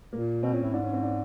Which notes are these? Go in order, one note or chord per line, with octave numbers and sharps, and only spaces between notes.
A#2 A#3
B2 C4
A#2 C#4
A2 E4
G#2 D4
C#4
C4
D4